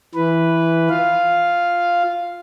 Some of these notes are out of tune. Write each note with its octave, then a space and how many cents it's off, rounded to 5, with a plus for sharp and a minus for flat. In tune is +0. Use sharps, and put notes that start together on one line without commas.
E3 +0 B4 +0
F4 +0 F5 +0